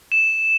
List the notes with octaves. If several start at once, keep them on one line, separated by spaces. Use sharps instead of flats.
E7